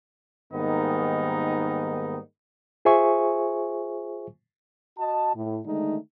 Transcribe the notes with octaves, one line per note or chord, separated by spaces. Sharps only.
G#2 D#3 G3 A#3 B3 D#4
F4 G#4 C5 E5 G#5 C#6
F#4 D#5 A5
A2
D3 D#3 G#3 A3 D#4